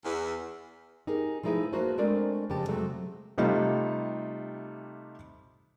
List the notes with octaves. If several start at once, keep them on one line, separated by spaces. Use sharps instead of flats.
E2
D#4 G4 G#4 A#4
F3 A3 D#4 E4 G#4 B4
A#3 F#4 B4 C5 A5
G#3 A3 C4 D4 A#4 D5
F2 C#3 G4 A5
C3 F#3 G#3 A3
C3 G3 A3 D#4 F4